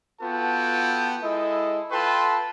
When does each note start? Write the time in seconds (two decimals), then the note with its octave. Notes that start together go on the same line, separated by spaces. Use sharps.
0.22 B3 F4 F#4 A4 G5 A5
1.23 G#3 E4 A4 D#5
1.92 F4 A4 B4 G5 A5 C6